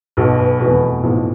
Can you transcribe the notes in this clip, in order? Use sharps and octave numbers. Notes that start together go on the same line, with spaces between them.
B1 B2 B4
B4
F1 E2 B2 B4
B1 A2 F3